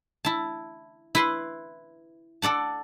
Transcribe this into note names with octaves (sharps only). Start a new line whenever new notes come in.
E4 A5
E4 B4 C6
A4 D5 F#5 A5